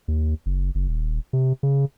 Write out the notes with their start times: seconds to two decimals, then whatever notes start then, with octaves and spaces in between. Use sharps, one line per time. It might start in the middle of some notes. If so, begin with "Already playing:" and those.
0.08 D#2
0.46 F#1
0.75 F#1
0.88 D#1
1.33 C3
1.63 C#3